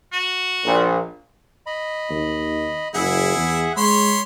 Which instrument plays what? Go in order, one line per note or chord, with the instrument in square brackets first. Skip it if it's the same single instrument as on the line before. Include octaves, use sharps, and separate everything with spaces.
[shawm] F#4
[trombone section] A#1 A#2
[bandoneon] D#5 B5
[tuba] D#2
[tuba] F#1 [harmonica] E4 [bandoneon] G#4 E5 F#5
[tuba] E2
[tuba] G#3 [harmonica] C#5 B5 C6